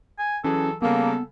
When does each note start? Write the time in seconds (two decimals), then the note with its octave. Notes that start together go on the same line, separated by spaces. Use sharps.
0.19 G#5
0.44 E3 F#3 C#4 G#4 A4
0.82 C#3 G3 A#3 B3 A4